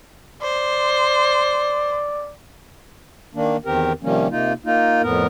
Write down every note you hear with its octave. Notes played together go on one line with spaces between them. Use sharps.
C5 D5
D#3 A#3 D4
E2 D#3 C4 G4 A#4
C3 D#3 F3 G3 A#3 C#4
C3 A#3 D#4 F4
A#3 D#4 F4
F2 A2 B3 A#4